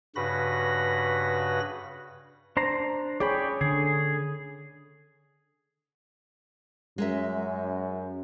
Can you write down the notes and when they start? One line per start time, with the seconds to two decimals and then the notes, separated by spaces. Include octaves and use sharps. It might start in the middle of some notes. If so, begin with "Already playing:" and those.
0.16 G2 C#3 F#4 B4 B5 A#6
2.57 D4 C5 A#5
3.20 G#4 C#5 D5 G5 B5
3.61 D3 G#4
6.98 F#2 G#3 A#4 E5